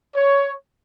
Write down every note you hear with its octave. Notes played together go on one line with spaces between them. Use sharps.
C#5